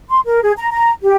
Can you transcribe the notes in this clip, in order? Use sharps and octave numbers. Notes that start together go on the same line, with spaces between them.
C6
A#4
G#4
A#5
A#5
G4